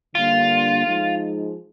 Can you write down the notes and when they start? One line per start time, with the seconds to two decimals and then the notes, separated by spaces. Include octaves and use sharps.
0.15 D3 G3 A#3 D4 F4
0.86 F3 G#3 D#4 G#4